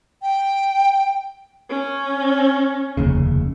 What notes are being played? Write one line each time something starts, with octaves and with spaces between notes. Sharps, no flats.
G5
C#4
F1 D#2 C#3